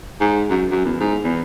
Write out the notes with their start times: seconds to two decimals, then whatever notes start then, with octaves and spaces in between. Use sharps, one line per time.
0.21 G#2
0.50 F#2
0.71 F#2
0.85 E2
1.00 G#2
1.24 E2